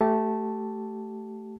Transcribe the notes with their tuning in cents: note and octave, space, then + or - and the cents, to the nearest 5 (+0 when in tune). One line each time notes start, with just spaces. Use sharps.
A3 +0 G4 -25 A5 +0